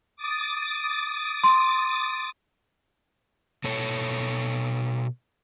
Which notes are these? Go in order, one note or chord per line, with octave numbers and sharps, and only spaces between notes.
D6 D#6 A6
C6
B2 A4 C#5